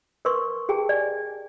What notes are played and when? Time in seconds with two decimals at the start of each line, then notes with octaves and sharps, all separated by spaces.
0.25 A#4 B4 C6 C#6
0.69 G4 G#4 G5 A5
0.89 D5 G#5